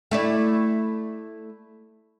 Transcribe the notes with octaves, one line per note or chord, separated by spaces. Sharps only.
A3 E4 D5